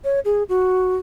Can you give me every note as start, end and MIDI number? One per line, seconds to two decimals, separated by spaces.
0.04 0.20 73
0.25 0.43 68
0.49 0.95 66